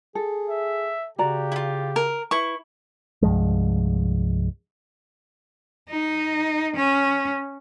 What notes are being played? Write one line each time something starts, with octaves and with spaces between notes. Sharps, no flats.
G#4 A4
E5
C#3 F#4 G4 D5 A#5
E4 F4
A#4
E4 B4 C#6
C2 G2 F3 G#3
D#4
C#4